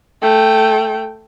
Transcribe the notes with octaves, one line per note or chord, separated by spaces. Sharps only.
A3 G5